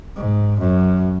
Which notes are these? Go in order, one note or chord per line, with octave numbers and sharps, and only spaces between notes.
G#2
F#2